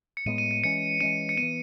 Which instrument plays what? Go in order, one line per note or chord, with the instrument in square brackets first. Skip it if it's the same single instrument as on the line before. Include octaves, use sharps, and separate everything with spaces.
[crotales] C#7
[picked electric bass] A2 G#3 B3 [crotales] D#7
[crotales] D#7
D#7
[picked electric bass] E3 G#3 C#4 [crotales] C#7
[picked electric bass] E3 G#3 C#4 [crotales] D#7
[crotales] C#7
[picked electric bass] E3 B3 [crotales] D#7